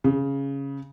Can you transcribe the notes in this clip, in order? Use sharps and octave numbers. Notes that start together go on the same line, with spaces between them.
C#3